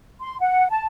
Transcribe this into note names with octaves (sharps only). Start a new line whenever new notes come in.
C6
F#5
A5